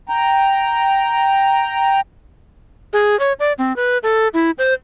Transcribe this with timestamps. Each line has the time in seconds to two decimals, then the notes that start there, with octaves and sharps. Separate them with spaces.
0.09 G5 A#5
2.93 G#4
3.19 C#5
3.40 D5
3.58 C4
3.76 B4
4.03 A4
4.34 E4
4.58 C5